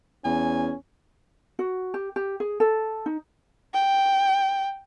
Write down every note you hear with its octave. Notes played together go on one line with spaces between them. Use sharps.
E2 C#4 G#5
F#4
G4
G4
G#4
A4
D#4
G5